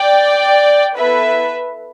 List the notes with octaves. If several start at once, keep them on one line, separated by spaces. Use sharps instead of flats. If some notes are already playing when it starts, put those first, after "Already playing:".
Already playing: D5 G5
B3 E4 A4 B4 E5